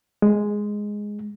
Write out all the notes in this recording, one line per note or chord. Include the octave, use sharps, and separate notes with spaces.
G#3